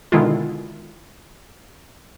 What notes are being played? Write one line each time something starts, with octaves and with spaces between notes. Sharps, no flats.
B2 D3 D#3 G#3 E4 F4